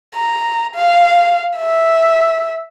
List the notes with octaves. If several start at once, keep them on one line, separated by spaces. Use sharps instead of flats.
A#5
F5
E5